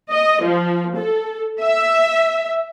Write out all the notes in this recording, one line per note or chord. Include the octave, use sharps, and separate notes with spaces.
D#5
F3
A4
E5